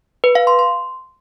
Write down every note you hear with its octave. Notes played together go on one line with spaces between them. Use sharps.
B4
F5
C6
C6